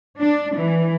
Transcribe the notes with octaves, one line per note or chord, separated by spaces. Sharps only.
D4
E3